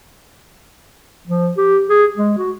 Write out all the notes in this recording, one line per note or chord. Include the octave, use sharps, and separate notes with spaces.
F3
G4
G#4
G#3
F#4